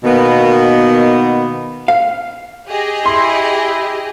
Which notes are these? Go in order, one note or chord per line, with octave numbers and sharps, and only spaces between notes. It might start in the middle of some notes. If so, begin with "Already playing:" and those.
B2 D#3 A#3 B3
F5
G4 G#4 D#5
E4 C6